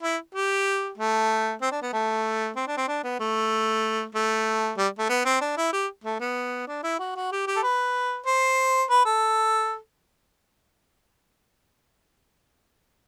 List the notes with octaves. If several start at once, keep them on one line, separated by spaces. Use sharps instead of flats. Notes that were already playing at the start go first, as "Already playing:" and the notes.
E4
G4
A3
C4
D4
B3
A3
C4
D4
C4
D4
B3
A3
A3
G3
A3
B3
C4
D4
E4
G4
A3
B3
D4
E4
F#4
F#4
G4
G4
A4
B4
C5
B4
A4